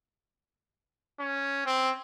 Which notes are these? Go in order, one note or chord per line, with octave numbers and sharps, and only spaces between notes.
C#4
C4